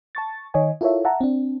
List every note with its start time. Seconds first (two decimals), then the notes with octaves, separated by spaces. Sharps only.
0.15 A5 C#6 A6
0.54 D#3 C#5 D#5 G#5
0.81 E4 F4 A4 A#4 C#5 E5
1.05 E5 F#5 A5 A#5
1.21 C4 D4